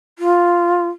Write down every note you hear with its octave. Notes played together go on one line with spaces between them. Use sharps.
F4